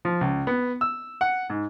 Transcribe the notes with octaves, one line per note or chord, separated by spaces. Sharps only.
F3
C#2
B3
E6
F#5
G#2